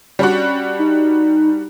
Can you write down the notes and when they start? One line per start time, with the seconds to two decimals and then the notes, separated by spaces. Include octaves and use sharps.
0.19 G3 C#4 D4 F#4
0.79 D#4